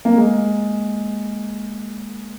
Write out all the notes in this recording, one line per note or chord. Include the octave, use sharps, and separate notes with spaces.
A#3
G#3